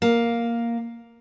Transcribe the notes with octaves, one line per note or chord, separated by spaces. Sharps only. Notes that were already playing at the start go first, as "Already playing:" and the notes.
A#3